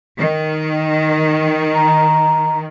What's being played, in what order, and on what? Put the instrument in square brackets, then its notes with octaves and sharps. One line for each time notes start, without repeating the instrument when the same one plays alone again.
[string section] D#3
[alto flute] A#5